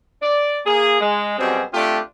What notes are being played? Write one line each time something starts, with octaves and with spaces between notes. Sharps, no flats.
D5
A#3 G#4
G#3
F#2 B2 G3 C4 G#4
A3 C4 D4 F4 G4